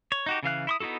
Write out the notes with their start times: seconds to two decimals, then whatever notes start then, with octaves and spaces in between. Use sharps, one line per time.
0.12 C#5
0.26 D#4 F#4 G4
0.43 C#3 E3 F5 F#6
0.67 E4 C6 D#6
0.80 B3 D#4 E4 F#4 A4